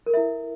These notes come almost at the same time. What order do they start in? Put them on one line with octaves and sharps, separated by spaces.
A#4 A4 E5 E4